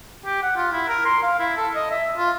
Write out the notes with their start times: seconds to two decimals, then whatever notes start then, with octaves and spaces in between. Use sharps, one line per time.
0.25 G4
0.43 F#5
0.56 F4
0.72 E4
0.88 A#4
1.05 C6
1.23 F5
1.39 E4
1.56 A4
1.75 D#5
1.91 E5
2.17 F4